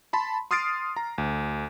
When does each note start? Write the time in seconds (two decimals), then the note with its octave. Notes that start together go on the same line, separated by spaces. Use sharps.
0.13 A5 B5 C6
0.51 C6 D#6 F6 A6 C7 D7
0.96 A#5
1.18 D2